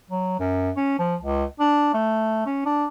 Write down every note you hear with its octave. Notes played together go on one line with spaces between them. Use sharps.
F#3
F#2
C#4
F3
C#2
D4
A3
C#4
D4